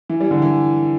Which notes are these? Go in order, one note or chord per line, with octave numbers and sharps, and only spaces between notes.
E3
G3
D3
E3